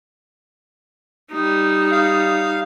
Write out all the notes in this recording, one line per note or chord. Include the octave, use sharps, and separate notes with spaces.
G3 D#4
F5